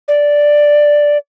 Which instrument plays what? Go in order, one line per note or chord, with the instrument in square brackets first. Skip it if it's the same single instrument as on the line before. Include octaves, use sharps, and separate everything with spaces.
[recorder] D5